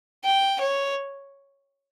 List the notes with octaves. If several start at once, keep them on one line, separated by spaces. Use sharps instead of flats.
G5
C#5